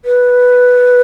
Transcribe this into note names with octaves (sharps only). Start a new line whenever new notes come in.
B4